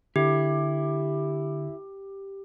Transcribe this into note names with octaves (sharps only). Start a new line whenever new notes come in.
D3 E4 G4